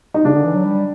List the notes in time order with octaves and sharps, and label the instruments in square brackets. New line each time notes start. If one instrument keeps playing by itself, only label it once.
[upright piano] D#4
[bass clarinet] C#3 [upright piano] D4
[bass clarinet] D3
E3
F#3
G3